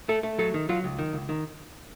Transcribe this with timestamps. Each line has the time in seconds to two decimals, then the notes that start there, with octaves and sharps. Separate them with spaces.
0.09 A3 A4
0.23 A3
0.38 F#3 A4
0.54 D#3
0.69 F#3 F4
0.84 C#2
0.99 D#3
1.13 C#2
1.29 D#3